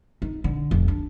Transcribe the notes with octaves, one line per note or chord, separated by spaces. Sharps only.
D#4
D3
F1
D4